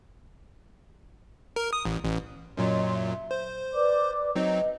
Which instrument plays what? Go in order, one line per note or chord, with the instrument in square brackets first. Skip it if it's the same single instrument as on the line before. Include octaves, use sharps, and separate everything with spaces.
[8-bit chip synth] A#4
D#6
A1
A1
[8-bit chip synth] F#2 A#2 F#3 [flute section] C#5 D#5 C6
[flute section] E5
[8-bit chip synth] C5
[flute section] B4 D5 D6
[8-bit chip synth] F#3 C4 D#4 [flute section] B4 D#5